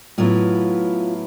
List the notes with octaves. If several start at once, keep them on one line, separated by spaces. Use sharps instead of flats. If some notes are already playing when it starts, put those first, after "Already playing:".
A2 F#3 B3 E4 F4